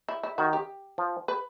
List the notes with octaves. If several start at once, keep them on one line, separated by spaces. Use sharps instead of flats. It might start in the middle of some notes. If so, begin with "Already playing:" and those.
E4
E4
D#3 F#4
G4
F3
B4